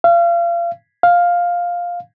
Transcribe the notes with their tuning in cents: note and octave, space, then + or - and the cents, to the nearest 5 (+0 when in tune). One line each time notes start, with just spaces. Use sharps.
F5 -35
F5 +5